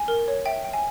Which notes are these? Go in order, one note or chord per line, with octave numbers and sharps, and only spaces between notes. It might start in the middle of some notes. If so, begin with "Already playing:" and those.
Already playing: G#5
A#4
C#5
E5 G5
G5
G#5